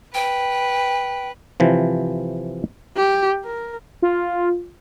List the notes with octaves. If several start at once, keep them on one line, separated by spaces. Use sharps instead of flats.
B4 G5
C3 E3 F3
G4
A#4
F4